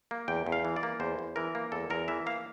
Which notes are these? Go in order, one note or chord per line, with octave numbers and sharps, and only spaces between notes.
A#3
E2 G5
E2
F5
E3
D5
A#3
E2 C5
E2
E3 A#4
A#3
E2 A4
E2 A#4
E3 E5
A#3 F5